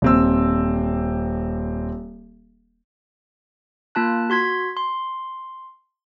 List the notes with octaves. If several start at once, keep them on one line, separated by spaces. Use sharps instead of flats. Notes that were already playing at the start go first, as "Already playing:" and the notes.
D#1 C4 E6
A#3 F4 A5 F#6
F#4 C6 G#6 B6
C6